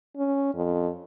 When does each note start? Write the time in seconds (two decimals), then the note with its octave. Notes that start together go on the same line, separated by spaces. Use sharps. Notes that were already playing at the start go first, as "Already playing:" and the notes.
0.17 C#4
0.54 F2